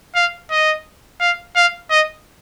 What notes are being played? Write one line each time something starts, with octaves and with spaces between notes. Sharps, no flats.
F5
D#5
F5
F5
D#5